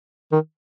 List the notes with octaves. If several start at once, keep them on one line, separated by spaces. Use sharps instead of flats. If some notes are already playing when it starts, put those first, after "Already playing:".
D#3